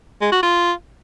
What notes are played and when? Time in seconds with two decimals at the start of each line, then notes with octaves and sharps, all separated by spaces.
0.21 G#3
0.32 F#4
0.43 F4